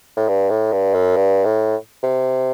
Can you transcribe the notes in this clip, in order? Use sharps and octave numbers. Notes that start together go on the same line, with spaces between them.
A2
G2
A2
G2
F#2
G2
A2
C3